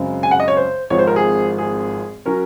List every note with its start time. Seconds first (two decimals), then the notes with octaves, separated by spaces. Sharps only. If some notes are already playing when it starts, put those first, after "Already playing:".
Already playing: F#2 C#3 G#3 C4
0.23 G#5
0.31 F#5
0.40 D#5
0.48 C#5
0.57 C5
0.90 G#1 G#2 F3 C4 C#5
0.99 C5
1.07 A#4
1.16 G#4
1.58 G#4
2.26 F#3 C#4 A#4